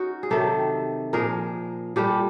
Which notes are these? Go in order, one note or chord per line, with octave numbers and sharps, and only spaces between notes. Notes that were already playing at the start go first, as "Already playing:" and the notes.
Already playing: C#4 D#4 F#4
G#4
C3 D#3 F#3 G4 A4
A#2 F3 G#4 A#4
A#2 G3 G4 A4